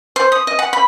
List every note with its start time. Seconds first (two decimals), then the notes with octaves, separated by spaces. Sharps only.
0.16 C5
0.32 D#6
0.47 D#5
0.59 F#5
0.73 B5